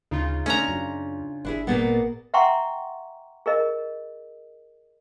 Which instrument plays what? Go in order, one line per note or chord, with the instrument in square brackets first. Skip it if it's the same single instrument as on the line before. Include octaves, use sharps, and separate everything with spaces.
[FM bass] D2 [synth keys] C#3 D#4 F4
[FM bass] A3 [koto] C#4 A#5 [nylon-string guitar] D4 D#5
[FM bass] F#2
[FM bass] G1 [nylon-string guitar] D4 E4 G#4
[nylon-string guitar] A#2 A#3 B3 [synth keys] G#4 F#5 A6
[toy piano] E5 F#5 G5 A#5 C6 C#6
G#4 A#4 D#5